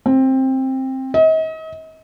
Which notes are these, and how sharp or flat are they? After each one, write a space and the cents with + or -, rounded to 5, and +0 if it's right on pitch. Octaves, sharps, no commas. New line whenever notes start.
C4 +15
D#5 +40